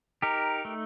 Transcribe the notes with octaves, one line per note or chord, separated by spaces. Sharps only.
D#4 G4 A#4
A3